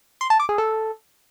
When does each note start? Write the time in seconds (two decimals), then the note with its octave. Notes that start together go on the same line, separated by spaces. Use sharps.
0.21 C6
0.30 A5
0.40 D6
0.49 G#4
0.58 A4